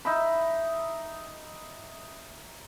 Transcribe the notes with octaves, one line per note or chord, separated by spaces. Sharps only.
D#4 E5 B5